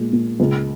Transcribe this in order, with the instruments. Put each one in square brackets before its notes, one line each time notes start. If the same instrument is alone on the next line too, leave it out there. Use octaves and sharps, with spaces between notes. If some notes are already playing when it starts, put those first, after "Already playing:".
Already playing: [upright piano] A#2 G#3
A#2
C#2